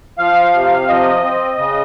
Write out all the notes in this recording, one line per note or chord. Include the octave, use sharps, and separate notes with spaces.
F3 F5
C3
F3 D#5
C4
C#3